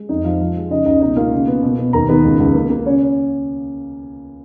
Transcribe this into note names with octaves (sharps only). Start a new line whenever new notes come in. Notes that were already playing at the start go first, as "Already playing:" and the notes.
Already playing: G#3
F2 D#4 D#5
F3 F4 F5
F3
G#3
C#3 D#4 D#5
C#2 D#4 D#5
B2 D#4 D#5
A#3 F4 F5
C#3
B3
B2
B2
D#2 A#4 A#5
D#3 B3 B4
C#2
C#2
A#3
A#3
C#3 C#4 C#5